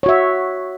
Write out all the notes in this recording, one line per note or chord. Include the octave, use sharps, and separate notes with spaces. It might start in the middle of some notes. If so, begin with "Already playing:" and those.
F#4 C#5 E5